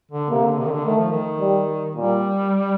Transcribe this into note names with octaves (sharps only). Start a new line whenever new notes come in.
D3
C3 A#3
D3
C3
D#3
D3
D#3 A3
F3
D#3
G3
A#2 G3